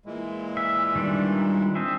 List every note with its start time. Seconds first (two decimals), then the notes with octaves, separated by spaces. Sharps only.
0.06 A#2 E3 G#3
0.57 E5
0.95 D#3 G3 D4
1.75 C4 G#4 E5